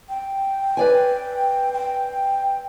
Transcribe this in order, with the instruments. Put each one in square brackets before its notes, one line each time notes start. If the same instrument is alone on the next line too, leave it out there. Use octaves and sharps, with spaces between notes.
[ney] G5
[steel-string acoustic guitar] B4 D5 G#5
[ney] G5